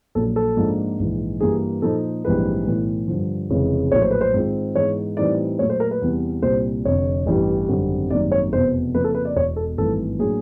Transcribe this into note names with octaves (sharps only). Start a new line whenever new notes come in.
A#1 A#2 F#3 A4
A4
G#2 F3 A#3 D4 F4
A#1 G#2 E3
G2 E3 G3 A#3 G#4
A#2 F3 A#3 D#4 A4
A#1 G#2 E3 G3 C4 B4
B1 A2 E3
G2 D3 F3
F1 F2 C#3 E3 G#3
A#1 A2 F#3 C#5
C5
B4
C5
G#2 D#3 G#3 C4 F4
G#2 E3 G#3 B3 C#5
A2 E3 G3 C4 D#4 D5
A#2 F#3 A3 C#5
C5
A#4
B4
E2 C3 E3 G3
C2 A#2 G3 C5
F1 F2 D3 C#5
A1 G2 E3 G3
G#1 F#2 D3 G3 C4
G#1 F#2 D#3 G3 A#3 D5
C#5
F1 E2 B2 C5
F2 C#3 F3 A#3 B4
A4
B4
D5
E1 E2 B2 C#5
A4
G#1 G2 E3 A3 A4
A2 F#3 A#3 D4 G#4